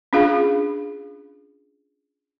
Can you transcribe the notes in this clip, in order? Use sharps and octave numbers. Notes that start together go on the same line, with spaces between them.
C#4 D4 F4 G#4 F5